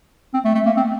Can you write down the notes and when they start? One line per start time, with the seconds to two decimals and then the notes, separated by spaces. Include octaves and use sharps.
0.34 C4
0.45 A3
0.55 A3
0.66 A#3
0.77 C4